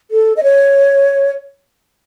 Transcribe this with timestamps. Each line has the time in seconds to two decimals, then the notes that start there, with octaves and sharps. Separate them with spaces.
0.11 A4
0.37 D#5
0.43 C#5